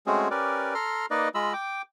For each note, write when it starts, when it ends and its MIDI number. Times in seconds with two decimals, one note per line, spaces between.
0.07 0.28 56
0.07 0.28 57
0.07 0.28 60
0.07 0.28 61
0.07 0.28 66
0.07 0.28 68
0.31 0.74 61
0.31 0.74 67
0.31 0.74 70
0.31 0.74 71
0.31 0.74 74
0.74 1.06 69
0.74 1.06 82
0.74 1.06 84
0.74 1.06 89
1.11 1.29 58
1.11 1.29 63
1.11 1.29 71
1.11 1.29 74
1.11 1.29 75
1.35 1.53 56
1.35 1.53 65
1.35 1.53 75
1.35 1.53 83
1.35 1.53 88
1.53 1.82 79
1.53 1.82 86